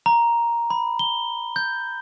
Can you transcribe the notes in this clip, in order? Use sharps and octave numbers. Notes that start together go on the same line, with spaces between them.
A#5
B5
G7
G6